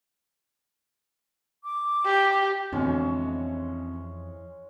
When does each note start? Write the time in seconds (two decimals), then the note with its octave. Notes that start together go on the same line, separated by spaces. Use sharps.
1.65 D6
2.06 G4
2.72 F2 B2 D3 E3 G#3 C4 C#4